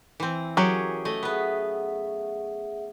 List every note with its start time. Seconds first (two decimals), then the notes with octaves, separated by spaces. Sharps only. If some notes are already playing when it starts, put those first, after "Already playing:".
0.20 E3 C4
0.57 F#3 C#4 G4 G#4 A#4 A#5
1.05 A3 D#5
1.23 B3 G#4 B4 E5 F#5